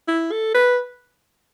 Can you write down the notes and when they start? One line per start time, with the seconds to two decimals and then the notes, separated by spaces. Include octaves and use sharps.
0.08 E4
0.32 A4
0.55 B4